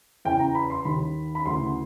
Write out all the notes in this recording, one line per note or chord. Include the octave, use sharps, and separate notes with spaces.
E2 C#3 E3 G5
A#5
B5
C6
D#2 D#3 B5
B5
D2 C#3 E3 C6